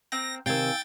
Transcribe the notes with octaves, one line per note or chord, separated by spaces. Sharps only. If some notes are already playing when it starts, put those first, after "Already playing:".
A#3 C4 G5 A#6
C3 D#3 F5 G5 G#5 E6 A6